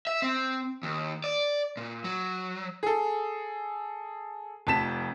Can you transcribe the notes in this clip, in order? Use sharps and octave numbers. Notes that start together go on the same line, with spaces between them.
E5
C4
D#2
D5
A#2
F#3
G#4 A4
F1 F2 A5 B6 E7